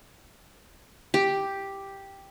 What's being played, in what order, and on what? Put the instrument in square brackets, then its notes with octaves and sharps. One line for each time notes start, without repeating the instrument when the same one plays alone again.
[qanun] G4